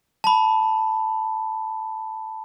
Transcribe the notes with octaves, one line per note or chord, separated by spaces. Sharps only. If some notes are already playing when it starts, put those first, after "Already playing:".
A5 B5